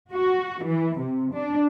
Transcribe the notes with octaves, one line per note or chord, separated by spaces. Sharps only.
F#4
E3
C3
D4